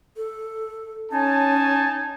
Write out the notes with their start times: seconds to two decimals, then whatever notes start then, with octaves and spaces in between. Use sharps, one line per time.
0.17 A4
1.11 C#4 D#4 G#5 A5